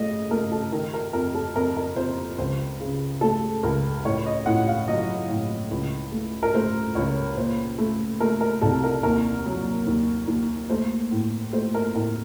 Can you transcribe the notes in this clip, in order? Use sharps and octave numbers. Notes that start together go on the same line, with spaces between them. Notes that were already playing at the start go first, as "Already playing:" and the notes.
Already playing: C#3 A3 D#5
A3 A#4
A4
D#3 A#4
A#4
F2 A#4
A4
F2 A#4
A#4
F2 C5
C#2 C5
C#3
A3 A4
C#2 A#4
A2 C#5
D#5
A2 F#5
F5
F#3 D#5
A2
C#2
A3
A#4
A3 C5
C#2 C#5
A#2 C5
A3
A3 A#4
A#4
C2 A4
A#4
D#2 A#4
F#3
D#2
D#2
A3 C5
A2
A3 C5
A#4
A2 A#4